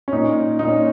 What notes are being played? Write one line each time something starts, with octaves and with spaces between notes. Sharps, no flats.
C#4
A#2 D#4
A#2 D#4
C#4